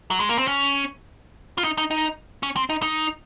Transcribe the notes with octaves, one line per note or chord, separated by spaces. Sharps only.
F#3
G#3
A#3
C4
C#4
F4
D#4
D#4
D#4
C#4
C4
D#4
D#4